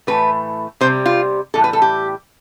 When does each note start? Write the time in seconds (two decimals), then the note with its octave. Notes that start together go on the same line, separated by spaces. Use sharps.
0.07 A2 E3 A3 B4
0.81 C3 G3 C5
1.06 F4
1.54 A2 E3 G3 A4
1.64 B4
1.73 A4
1.82 G4